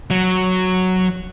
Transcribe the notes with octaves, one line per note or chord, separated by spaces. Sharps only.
F#3